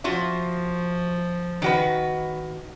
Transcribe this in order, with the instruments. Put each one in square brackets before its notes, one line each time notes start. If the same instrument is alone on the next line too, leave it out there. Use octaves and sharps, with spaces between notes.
[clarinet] F3 [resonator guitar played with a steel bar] F4 F#4 E5
[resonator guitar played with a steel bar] D#3 F#4 B4